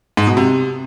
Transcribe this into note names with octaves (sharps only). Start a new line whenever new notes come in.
G#2
B2
C3